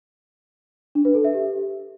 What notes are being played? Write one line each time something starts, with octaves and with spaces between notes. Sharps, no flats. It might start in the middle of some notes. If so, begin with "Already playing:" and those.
D4
B4
A4
E5
G4